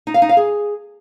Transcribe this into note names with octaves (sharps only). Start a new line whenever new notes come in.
D#4
F5
D#4
F5
G#4